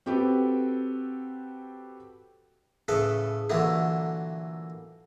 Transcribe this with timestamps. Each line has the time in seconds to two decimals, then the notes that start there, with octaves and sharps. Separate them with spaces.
0.06 C4 F#4 G4 A4 B4
2.88 A2 C#3 A4 B4
3.50 A#2 D3 E3 F#3 A3